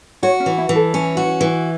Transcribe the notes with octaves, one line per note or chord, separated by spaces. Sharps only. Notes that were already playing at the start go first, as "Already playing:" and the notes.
F#4 C#5
C#4
E3
E4
E3
A4
C#4
F#4
E3